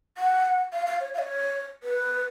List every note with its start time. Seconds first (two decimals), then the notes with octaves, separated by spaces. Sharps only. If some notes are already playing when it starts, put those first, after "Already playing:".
0.17 F#5
0.72 F5
0.86 F5
1.00 C#5
1.14 F5
1.18 C#5
1.83 B4